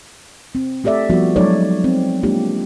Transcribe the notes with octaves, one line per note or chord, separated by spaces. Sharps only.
C4
A3 G4 A4 D5 E5
F3 G3 B3 D#4 F#4
F#3 G#3 D#4 A4 C#5 D5
C4
G#3 A#3 D4 F4 G4